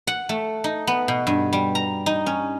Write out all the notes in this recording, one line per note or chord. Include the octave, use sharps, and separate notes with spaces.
F#5
A3
D#4
B3
B2
G2
G3
A#5
D#4
C#4